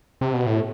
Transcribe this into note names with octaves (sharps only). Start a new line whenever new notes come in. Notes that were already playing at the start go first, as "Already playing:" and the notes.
C3
B2
A2